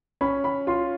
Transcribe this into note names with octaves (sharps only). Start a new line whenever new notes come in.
C#4 B5
B5
F4 C6